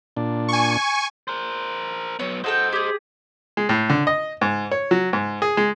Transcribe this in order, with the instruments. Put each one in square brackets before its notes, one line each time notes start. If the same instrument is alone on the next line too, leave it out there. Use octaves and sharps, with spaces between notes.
[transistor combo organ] A#2 D4
[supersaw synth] G#5 C#6
[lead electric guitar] A#4 C5
[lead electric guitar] F#3 B3 [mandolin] C#5
[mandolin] F#4 A4 G5 [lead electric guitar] C5 D#5
[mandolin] G4 G#4
[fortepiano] G#3
A2
D3
D#5
G#2
C#5
F#3
G#2
G#4
G#3